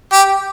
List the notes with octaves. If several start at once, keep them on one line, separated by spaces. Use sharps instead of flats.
G4